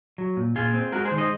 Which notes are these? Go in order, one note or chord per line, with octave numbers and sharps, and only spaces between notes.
F#3
A#2
A#2 F4 G#4
C4
G#3 F#4 A#4
G#4 C5
D#3
C5 D#5